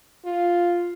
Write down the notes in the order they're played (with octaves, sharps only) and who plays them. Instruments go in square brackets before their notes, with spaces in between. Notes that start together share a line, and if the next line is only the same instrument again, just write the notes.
[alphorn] F4